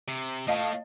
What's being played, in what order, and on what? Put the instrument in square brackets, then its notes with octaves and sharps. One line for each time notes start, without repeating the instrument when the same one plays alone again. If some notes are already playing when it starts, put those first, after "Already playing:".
[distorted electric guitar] C3
[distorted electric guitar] A2 [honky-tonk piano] D#5 F5 A5